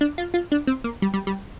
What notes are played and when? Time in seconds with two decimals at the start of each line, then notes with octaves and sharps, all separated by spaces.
0.01 D4
0.18 F4
0.34 F4
0.52 D4
0.67 C4
0.84 A#3
1.02 G3
1.14 G3
1.27 G3